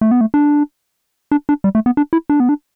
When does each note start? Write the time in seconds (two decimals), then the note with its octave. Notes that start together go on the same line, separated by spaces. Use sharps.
0.01 A3
0.11 B3
0.21 A3
0.34 D4
1.32 D4
1.49 D4
1.64 G3
1.75 A3
1.86 B3
1.97 D4
2.13 E4
2.30 D4
2.40 B3
2.49 D4